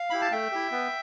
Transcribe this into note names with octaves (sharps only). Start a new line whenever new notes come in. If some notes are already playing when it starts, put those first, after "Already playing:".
Already playing: F5
E4 G4 B5
A5
A3 E5 G5
E4 G4
B3